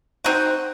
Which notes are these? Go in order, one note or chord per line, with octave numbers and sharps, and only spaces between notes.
C4 D#4 F#4